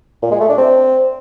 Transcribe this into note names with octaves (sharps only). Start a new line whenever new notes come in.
A#2
G#3
A3
D4
C4